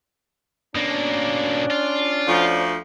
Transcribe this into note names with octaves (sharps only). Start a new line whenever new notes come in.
B2 A#3 C#4 D4
F4
D2 F3